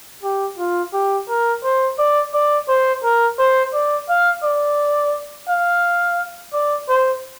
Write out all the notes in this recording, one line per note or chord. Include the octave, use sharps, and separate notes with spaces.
G4
F4
G4
A#4
C5
D5
D5
C5
A#4
C5
D5
F5
D5
F5
D5
C5